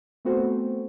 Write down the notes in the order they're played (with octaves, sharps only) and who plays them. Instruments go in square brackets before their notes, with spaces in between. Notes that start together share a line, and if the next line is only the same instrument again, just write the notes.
[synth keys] A3 B3 C4 F#4 A4 C5